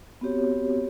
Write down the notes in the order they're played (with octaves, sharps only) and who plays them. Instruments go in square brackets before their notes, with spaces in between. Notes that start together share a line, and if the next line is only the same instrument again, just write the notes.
[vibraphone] B3 C4 F#4 G4 C#5